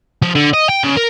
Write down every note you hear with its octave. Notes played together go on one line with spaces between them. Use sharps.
F3
D3
D#5
G5
C#3
A#4